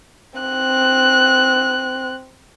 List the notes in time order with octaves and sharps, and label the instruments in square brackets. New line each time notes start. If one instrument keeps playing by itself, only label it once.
[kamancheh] C4 F#6